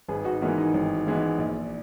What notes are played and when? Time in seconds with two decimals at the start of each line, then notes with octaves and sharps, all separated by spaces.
0.08 G#1 G#4 B4
0.24 D#4 F#4
0.41 G#2 E3 G#3 B3 F#4 A#4
0.57 D#4
0.74 G#1
1.07 G#2 E3 G#3 B3
1.38 A#1